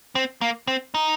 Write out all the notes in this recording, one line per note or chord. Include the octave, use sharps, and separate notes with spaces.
C4
A#3
C4
D#4